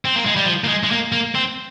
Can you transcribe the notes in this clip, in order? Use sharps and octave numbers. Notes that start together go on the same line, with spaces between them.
C4
A#3
G#3
G3
F3
A#3
G#3
G#3
A#3
A#3
C4